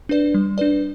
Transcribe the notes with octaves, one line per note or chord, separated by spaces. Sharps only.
D4 B4 D5
G3
D4 B4 D5